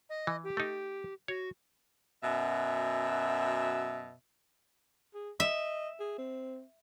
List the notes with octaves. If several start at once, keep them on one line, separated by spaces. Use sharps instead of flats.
D#5
E3
G4
A3 D#4
F#4 C#5
F#2 B2 E5
G#4
D#5 E5
G#4
C4